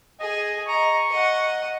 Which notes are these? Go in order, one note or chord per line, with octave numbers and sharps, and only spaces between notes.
G#4 D#5 G#5
D#5 A#5 C#6
D#5 F#5